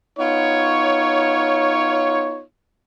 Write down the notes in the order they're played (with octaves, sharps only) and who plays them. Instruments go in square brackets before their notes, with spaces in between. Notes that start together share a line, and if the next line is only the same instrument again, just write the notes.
[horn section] B3 D#4 F4 C#5